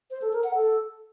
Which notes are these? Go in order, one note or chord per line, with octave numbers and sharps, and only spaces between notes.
C5
A4
A#4
F#5
A4